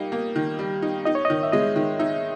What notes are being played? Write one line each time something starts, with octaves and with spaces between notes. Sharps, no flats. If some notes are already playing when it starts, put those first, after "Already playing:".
Already playing: G3 A#3 D#4
A#3
D#3
G3
D#4
D#4 D#5
C#5
D#3 D#5
E5
G#3 D#5
D#3
D#4 E5